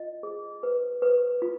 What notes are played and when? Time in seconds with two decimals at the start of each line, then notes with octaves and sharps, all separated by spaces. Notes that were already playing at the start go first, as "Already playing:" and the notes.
Already playing: F4 D#5
0.23 G#4
0.63 B4
1.02 B4
1.42 F4